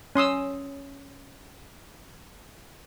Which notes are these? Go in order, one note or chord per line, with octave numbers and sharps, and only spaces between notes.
C#4 C6 D#6 E6